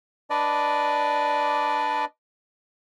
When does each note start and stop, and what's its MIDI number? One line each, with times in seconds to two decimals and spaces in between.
0.30 2.05 62
0.30 2.05 71
0.30 2.05 74
0.30 2.05 75